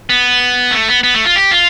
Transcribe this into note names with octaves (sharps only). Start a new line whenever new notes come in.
B3
A3
B3
B3
A3
F4
G4
F4